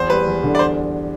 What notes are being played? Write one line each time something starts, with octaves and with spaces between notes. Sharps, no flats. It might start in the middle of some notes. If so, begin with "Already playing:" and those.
Already playing: E2 C5
G3 B4
E2
D3
D5
C5